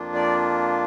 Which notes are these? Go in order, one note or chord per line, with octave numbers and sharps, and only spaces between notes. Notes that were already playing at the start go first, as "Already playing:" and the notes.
Already playing: F2 F3 A#3 D4 F4
D5